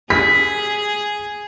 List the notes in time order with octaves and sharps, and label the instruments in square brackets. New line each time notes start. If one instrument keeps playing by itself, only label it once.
[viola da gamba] G#4 [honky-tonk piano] B6